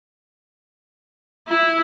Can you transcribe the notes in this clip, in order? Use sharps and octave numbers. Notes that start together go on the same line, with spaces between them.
E4